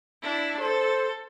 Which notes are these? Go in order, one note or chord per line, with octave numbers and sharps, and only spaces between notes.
D4 E4
A4 C5